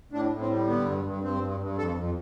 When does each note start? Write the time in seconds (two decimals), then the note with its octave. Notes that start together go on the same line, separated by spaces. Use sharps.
0.12 A2 D4
0.31 A2
0.40 C4
0.50 G3
0.67 D3 B3
0.85 G2
1.05 G2
1.23 G2 C4
1.42 G2
1.60 G2
1.78 F2 A4
1.96 F2